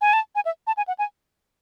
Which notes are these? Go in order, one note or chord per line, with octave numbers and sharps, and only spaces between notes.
G#5
A5
G#5
E5
A5
G#5
F#5
G#5